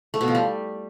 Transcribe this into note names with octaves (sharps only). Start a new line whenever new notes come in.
A3
B2
F3
G3